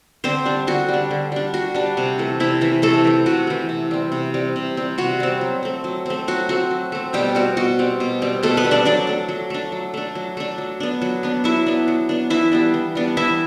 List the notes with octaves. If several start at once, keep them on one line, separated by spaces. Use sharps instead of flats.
D3 C4 C5
G3 D4
D3 F#4
G3 D4
D3
G3 D4
D3 F#4
G3 D4
C3
E3 A3
C3 E4
E3 A3
C3 A3 A4
E3 A3
C3 F#4
E3 A3
C3
G3 C4
C3
G3 C4
C3
G3 C4
C3 F#4
G3 C4
F#3
A3 C4
F#3
A3 C4
F#3 F#4
A3 C4 F#4
F#3
A3 C4
B2 G3 G4
G3 C4 F#4
B2 F#4
G3 C4
B2
G3 C4
B2 A3 A4
B3 B4
G3 C4
D4 D5
F#3 D4 D5
A3 D4
F#3
A3 D4
F#3
A3 D4
F#3
A3 D4
F#3
B3 D4
F#3
B3 D4
F#3 E4 E5
B3 D4
F#3
B3 D4
E3 E4 E5
G3 B3 D4
E3
G3 B3 D4
E3 E4 E5